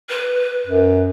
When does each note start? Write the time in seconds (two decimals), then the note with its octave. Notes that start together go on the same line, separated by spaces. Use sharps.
0.09 B4
0.66 F#2